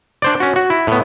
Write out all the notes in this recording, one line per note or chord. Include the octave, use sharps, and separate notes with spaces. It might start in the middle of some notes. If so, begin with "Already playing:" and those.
D4 C5 D5
C#4 F#4
F#4
E4
A2 B3